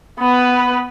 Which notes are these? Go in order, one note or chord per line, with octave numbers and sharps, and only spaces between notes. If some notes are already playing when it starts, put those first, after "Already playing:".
B3 B4